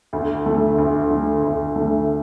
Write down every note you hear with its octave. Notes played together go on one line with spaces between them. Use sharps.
D2
D3 A3
D2
D3 A3
D2
D3 A3